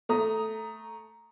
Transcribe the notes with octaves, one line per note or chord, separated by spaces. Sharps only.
A3 A#5 D#6